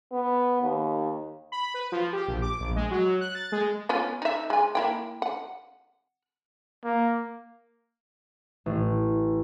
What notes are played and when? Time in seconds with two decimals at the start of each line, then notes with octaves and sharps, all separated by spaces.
0.12 B3
0.62 D#2
1.52 B5
1.74 B4
1.92 F3
2.13 G4
2.28 A#1
2.42 D6
2.60 A#1
2.76 G#3
2.91 F#3
3.21 F#6
3.35 A6
3.52 G#3
3.89 B3 C#4 F4
4.22 D#4 E5
4.50 G#3 G#5
4.75 A#3 E4 G5
5.22 F#5
6.84 A#3
8.66 A1